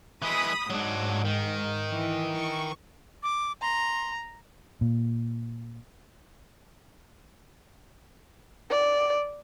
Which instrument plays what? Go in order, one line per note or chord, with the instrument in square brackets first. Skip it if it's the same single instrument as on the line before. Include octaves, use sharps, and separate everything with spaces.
[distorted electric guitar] E3 G#3 [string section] B5 D#6
[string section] G#2 [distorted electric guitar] F#3 D4
[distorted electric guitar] D#3
[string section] E3
E3 C#6
[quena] D6
[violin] A#5 [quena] C6
[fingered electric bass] A#2
[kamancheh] D5